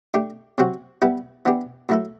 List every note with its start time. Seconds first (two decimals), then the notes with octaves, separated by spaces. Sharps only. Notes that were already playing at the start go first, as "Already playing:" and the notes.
0.14 A3 D4 G4
0.58 C3 F#3 C4 F#4
1.02 G3 B3 E4 B4
1.45 E3 B3 D4 G4
1.89 A2 F#3 A3 E4 A4